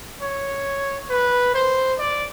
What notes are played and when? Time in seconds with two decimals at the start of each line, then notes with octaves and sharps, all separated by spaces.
0.21 C#5
1.10 B4
1.54 C5
1.99 D5